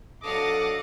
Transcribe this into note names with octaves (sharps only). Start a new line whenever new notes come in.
F#3 D4 A4 D#5 F5 F#5 D6